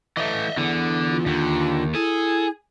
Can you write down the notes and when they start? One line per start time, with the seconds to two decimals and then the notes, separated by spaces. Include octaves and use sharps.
0.17 E3 A3 D#5 E5
0.57 D3 E3 B3 E4
1.10 F4
1.26 D#2 D3
1.95 E4 G#4 A4